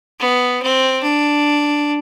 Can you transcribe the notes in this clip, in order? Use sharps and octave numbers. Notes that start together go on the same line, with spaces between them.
B3
C4
D4